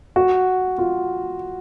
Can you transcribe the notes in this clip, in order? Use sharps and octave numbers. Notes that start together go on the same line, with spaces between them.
F#4
F4